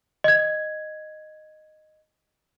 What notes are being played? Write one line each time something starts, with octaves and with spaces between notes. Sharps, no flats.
D#5 G#6